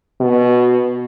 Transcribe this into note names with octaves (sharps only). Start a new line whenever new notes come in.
B2